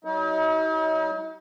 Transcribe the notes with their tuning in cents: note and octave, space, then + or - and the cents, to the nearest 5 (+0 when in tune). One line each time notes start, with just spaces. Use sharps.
F#3 +40 D#4 +45